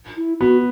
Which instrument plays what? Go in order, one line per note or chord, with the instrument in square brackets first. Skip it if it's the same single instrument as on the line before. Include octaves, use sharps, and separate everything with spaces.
[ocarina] E4
[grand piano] B3 [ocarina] F#4